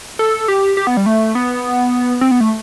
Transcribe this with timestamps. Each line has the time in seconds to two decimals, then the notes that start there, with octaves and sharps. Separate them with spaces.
0.19 A4
0.48 G4
0.77 G4
0.87 B3
0.97 G3
1.06 A3
1.35 B3
2.21 C4
2.31 B3
2.41 A3